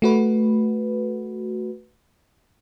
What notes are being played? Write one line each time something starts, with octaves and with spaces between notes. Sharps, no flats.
A3 F#4 B4